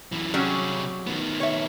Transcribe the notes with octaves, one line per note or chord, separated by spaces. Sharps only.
F#2 E3
C3 F#3 G3 C#4 G#4
D#3 B3
C#5 E5